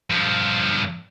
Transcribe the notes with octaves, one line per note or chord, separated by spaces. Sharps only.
G2 F3